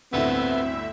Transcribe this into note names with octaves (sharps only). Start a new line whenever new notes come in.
G1 D2 A2 B3 C4 E5